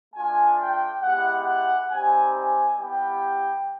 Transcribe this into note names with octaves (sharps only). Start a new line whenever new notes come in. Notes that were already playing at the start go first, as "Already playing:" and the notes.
A3 D4 F4 G#5
G5
G#3 B3 E4 G4 F#5
F#5
G3 C4 D#4 G4 G#5
G#5
G3 B3 E4 G4 G5